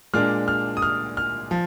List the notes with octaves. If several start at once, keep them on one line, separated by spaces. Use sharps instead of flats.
A#2 G#3 D4 F6
F6
D#6
F6
F6
F3